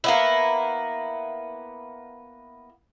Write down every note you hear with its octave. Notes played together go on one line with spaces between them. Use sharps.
A#3 B3 E4